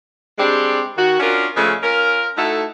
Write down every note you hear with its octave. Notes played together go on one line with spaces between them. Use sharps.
G3 G#3 C4 D4 G4
D#3 F#4
C#4 D4 F4 F#4 A#4
C#3 F3 G#3 A3 C#4
C#4 F4 A#4
A3 D#4 E4 F#4 A4